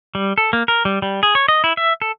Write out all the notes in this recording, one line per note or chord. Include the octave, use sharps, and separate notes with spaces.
G3
A4
A#3
A#4
G3
G3
G#4
C#5
D#5
E4
E5
A4